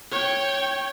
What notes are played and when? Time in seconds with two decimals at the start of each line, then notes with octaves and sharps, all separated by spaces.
0.11 C#5 G5